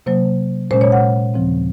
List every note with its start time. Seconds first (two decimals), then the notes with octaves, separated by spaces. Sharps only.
0.06 C3 F#3 A#3 C5
0.71 A#2 G#3 C#4 C5
0.81 C#5
0.92 F#5
1.34 D#2 C#3 F3 C4